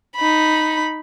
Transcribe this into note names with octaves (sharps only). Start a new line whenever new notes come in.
D#4 B5